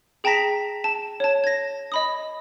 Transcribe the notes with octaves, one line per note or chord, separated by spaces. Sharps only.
G#4 G5 A5 A#5 A#6 B6
A5
C#5 A5
G#6 A#6
D#5 B5 D#6